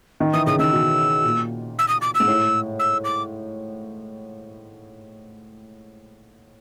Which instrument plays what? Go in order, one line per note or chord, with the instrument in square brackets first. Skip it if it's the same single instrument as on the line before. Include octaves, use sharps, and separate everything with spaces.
[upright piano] D#3
[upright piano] E3 [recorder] D#6
[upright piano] C#3 [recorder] D#6
[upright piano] D#3 [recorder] E6
[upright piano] B2
A#2
[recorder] E6
D#6
D6
E6
[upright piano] G#2
A2
[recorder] E6
D6